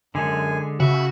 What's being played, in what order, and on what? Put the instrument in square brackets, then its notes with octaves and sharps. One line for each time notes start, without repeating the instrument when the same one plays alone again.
[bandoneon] F#2 G#5 [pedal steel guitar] D3 G#3 A4
[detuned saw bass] C#3 [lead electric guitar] F#4 [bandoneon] E5